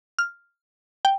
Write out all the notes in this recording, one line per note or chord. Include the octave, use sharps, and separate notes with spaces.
F6
G5